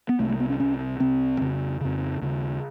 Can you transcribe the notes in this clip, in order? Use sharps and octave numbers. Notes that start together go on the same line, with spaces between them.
B3
C2 C3 A3
A3
B3
C#4
C2 C3 C#4
C2 C3 C4
F2 C#3
F2 C#3
D#2 C#3